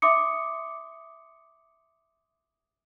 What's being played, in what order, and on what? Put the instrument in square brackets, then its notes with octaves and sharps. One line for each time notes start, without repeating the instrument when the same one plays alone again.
[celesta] E5 C6 D6 D#6 C#7